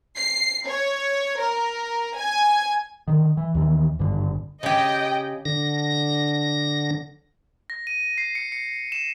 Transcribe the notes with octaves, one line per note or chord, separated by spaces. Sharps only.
C7
C#5
A#4
G#5
D3 D#3
E3
D#2 D#3 E3
G#1 G2 D3
C#3 G4 D#5 G5
D3 A#6
A#6
D#7
C7
C#7
C#7
E7